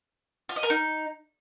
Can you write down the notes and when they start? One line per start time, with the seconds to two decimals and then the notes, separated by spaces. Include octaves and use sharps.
0.49 F4
0.56 D#5
0.63 A#4
0.70 D#4